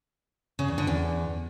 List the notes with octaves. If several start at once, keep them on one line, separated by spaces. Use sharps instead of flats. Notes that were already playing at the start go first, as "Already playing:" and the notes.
C#3
E2
D3
E2